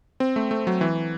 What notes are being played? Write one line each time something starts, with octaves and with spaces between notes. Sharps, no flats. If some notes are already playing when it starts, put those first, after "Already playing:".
C4
A3
A3
F#3
E3